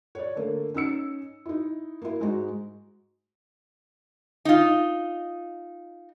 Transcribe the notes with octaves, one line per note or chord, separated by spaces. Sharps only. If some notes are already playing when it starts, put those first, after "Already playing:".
C#5 D5
D3 A3 A#3
C#4 D#4 E6 C#7
D#4 E4
A#3 E4
G#2 G#3 D#4 F#4
D#4 F4